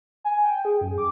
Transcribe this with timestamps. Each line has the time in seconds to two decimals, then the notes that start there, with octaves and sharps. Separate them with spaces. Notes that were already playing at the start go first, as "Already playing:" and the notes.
0.24 G#5
0.44 G5
0.65 G#4
0.81 F#2
0.98 D6